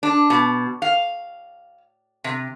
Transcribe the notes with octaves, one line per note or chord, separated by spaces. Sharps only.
D4
B2
F5
C3